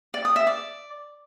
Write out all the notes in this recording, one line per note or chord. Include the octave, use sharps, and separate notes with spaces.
D5
D#6
E5
D5